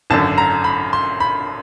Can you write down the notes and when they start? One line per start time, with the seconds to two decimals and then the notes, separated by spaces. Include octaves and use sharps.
0.10 G#1 F#2 D3 A5
0.38 A#5
0.64 B5
0.93 C6
1.20 B5